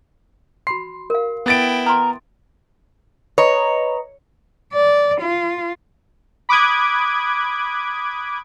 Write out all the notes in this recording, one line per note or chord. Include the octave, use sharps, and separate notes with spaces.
F#4 B5 C6 C7
A#4 F5
B3 E4 G5 A6 D7
A#4 C6 D#6
B4 C#5 D#5 A#5
D5
F4
B5 D6 D#6 F#6 G#6